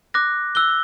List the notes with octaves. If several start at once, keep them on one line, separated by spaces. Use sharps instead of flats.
D6 F#6 A#6
E6 F#6 G7